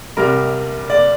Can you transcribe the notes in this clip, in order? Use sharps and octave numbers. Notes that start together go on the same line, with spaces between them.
C2 C3 G3 A#4
D5